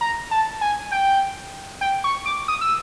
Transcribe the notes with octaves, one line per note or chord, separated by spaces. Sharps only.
A#5
A5
G#5
G5
G5
C#6
D6
D#6
E6